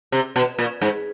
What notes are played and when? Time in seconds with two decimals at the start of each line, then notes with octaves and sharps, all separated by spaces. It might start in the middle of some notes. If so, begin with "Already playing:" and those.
0.12 C3
0.36 B2
0.59 A#2
0.81 G#2